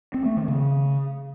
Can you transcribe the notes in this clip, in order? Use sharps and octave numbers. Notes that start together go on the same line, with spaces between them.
C4
A3
D#3
C#3